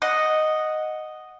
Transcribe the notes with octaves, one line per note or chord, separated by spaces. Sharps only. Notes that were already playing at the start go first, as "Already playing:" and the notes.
D#5 F#5